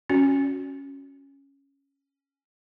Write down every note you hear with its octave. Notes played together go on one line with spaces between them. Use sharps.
C#4 F#4